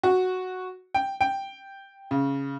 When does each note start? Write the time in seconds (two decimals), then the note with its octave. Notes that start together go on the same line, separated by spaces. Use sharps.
0.03 F#4
0.94 G5
1.21 G5
2.11 C#3